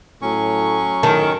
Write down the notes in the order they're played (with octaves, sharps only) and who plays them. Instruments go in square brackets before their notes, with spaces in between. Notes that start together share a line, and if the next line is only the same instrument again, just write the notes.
[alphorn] A2 [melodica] F#3 C#4 C#6
[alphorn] A2 [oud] D#3 [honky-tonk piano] A5